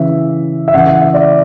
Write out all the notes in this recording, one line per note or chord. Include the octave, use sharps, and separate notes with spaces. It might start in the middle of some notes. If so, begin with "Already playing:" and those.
Already playing: C#3 E3 E5
E5
C#3 E3 F#5
F#5
E5
D5